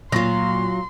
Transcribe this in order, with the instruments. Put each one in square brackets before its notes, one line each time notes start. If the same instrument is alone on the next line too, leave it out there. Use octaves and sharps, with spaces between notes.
[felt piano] A#2 A#6 [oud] F#3 F4 [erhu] C6